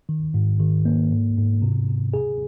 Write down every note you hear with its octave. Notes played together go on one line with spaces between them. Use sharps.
D#3
G#2
D#3
A#3
G#2
G#2
C3
C3
G#4